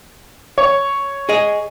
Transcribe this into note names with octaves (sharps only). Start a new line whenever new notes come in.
C#5
G#4 D#5